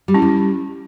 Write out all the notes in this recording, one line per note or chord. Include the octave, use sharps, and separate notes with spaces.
G3
C#4 E4
G3